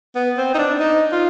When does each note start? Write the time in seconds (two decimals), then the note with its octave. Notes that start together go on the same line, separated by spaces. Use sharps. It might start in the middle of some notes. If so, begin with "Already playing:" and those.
0.15 B3
0.37 C4
0.54 D#4
0.58 D4
0.80 D#4
1.12 F4